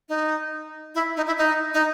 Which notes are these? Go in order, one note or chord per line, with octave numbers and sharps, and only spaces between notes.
D#4
E4
D#4
E4
D#4
D#4